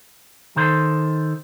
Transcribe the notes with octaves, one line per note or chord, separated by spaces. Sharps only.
D#3 A4 C5